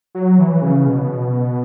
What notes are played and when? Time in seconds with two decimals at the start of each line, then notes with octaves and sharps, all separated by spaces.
0.15 F#3
0.38 E3
0.62 C#3
0.86 B2